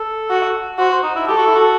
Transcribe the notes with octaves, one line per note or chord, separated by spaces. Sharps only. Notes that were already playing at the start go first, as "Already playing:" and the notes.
Already playing: A4
F#4
F#4 C5
C5
D#4
E4
G4 A4
F#4
E4
F#4